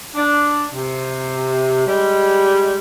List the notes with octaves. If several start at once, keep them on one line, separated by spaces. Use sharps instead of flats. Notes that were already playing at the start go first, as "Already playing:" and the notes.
D4
C3
G3 G#3